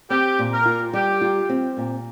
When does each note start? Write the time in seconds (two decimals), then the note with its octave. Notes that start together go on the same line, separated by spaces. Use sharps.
0.10 C4 G4
0.39 A#2
0.53 A#4
0.66 F4
0.93 G3 G4
1.21 F4
1.49 C4
1.77 A#2